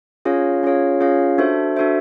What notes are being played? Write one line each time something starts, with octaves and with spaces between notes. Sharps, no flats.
C#4 F4 G#4 C#5 F5
C#4 F4 G#4 C#5 F5
C#4 F4 G#4 C#5 F5
D4 F#4 A4 C5 E5
D4 F#4 A4 C5 E5